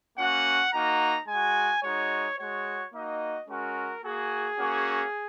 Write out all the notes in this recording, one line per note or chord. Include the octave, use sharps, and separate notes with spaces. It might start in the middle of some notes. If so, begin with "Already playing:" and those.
A#3 C#4 F#4 F#5
A#3 D#4 F#4 A#5
G#3 G#5
F#4
G#3 D#4 F#4 C#5
G#3 F#4 C#5
A#3 D#4 F#4 D#5
G#3 C#4 F#4 A#4
A#3 F#4 G#4
A#3 C#4 F#4